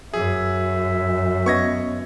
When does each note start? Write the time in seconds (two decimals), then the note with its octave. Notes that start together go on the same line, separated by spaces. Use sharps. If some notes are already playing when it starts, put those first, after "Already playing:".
0.14 F#2 G#4 E5
1.46 B3 C#4 D#5 C#6 G#6 A#6